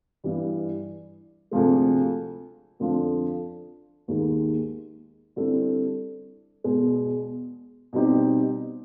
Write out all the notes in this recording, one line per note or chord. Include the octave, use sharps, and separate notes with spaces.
G2 E3 G3
D2 C3 F3 G#3
F2 D3 F3
D#2 D#3 G#3
D3 G3 C4 E4 A4
E2 B2 G#3
B2 G3 C4 D#4 G4